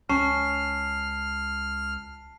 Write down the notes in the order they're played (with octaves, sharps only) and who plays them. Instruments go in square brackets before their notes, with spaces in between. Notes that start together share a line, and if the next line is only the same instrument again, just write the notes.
[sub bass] C#2 [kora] C#4 [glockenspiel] A5 C7 [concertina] F6